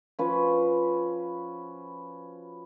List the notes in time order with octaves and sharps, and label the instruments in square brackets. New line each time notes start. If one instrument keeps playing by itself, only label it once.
[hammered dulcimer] F3 C#4 F#4 B4